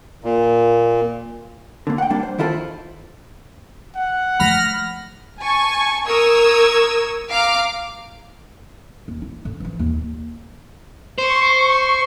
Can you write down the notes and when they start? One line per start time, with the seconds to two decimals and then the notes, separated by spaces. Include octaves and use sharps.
0.24 A#2
1.87 D3 A#3
1.98 F#5 G5
2.10 G3 A#3 D4
2.23 C5
2.38 D#3 E4 F4 A4 B4 C5
3.96 F#5
4.40 F3 A3 B5 F6 A#6
5.40 G#5 A5 C#6
6.06 A#4 C#6 D#6 E6 G#6
7.30 F5 A#5 D6 F6
9.08 D#2
9.22 E4
9.45 D3
9.60 E3 F3
9.79 D#2
11.18 C5 C#6